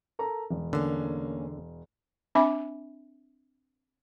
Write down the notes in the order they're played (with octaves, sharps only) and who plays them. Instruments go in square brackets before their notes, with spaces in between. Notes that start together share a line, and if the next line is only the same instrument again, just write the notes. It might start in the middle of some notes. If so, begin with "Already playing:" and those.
[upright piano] A4 A#4 A#5
E1
[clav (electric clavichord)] D3 [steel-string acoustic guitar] A#3 C#4
[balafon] C4 D4 E5 G#5 B5 D6